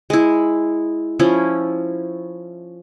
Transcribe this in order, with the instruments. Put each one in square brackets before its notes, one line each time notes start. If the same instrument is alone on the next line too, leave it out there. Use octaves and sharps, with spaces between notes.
[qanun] G#3 E4
F3 C#4 E4